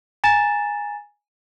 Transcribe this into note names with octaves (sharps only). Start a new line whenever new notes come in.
G#5 A#5 A6 E7